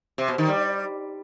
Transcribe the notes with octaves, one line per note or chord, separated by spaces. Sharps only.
C3
B2
D#3
G3